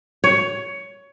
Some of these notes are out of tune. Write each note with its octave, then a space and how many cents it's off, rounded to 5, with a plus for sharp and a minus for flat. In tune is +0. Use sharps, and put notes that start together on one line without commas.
C#5 +15